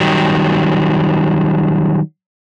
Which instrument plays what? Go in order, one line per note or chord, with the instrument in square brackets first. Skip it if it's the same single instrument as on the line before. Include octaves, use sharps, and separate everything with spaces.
[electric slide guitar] D#3 F#3 G3